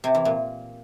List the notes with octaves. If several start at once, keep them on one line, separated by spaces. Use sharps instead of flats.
C3
E3
A#2